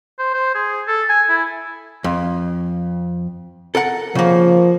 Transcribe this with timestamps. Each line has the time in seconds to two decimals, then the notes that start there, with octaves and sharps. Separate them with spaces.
0.19 C5
0.34 C5
0.55 G#4
0.88 A4
1.09 G#5
1.29 E4
2.04 F2
3.75 A4 A#4 F#5
4.15 C#3 F3 A#3